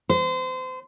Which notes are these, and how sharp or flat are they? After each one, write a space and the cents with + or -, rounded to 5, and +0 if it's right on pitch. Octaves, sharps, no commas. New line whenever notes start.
C5 -30